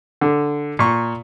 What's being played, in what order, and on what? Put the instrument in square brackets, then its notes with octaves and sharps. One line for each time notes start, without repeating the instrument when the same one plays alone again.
[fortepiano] D3
A#2 C#6